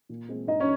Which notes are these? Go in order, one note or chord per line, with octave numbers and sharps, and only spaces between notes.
A#2
G#3 C4
G2 D#4 D#5
C#4 C#5